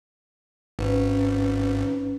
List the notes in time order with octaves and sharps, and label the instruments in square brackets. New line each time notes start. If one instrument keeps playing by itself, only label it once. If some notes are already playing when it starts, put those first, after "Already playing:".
[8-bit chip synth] G#1 [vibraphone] C#4 B4